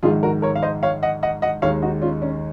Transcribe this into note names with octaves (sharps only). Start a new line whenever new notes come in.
A#1 G#2 D#3 G#3 F4 G#4
F#4 A#4
A#4 C#5
F5
C5 D#5
C#5 F5
D#5 F#5
D#5 F#5
D#5 F#5
D#2 D#3 G#3 C#5 F5
D#4 F#4
C#4 F4
C#4